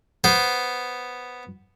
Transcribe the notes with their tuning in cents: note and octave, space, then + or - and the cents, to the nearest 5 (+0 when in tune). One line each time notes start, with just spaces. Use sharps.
B3 +0 C5 +0